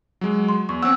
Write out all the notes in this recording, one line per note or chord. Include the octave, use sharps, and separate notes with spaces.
F#3 G#3
C6
E2 C#6
C4 C#4 F#5 E6